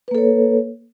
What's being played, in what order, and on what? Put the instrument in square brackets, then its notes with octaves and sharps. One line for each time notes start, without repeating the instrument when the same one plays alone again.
[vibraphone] B4
A#3
A4
C#5